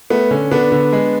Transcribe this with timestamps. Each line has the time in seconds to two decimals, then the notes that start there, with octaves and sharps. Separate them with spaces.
0.10 A3 B3
0.31 D3 C#4
0.51 D3 B3 D4
0.72 D3
0.92 G#3